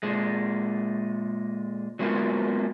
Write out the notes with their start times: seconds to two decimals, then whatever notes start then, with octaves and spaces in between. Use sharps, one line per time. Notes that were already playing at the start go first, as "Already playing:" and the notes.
0.03 A#2 G#3
1.99 F#3 G#3 A#3 B3 F4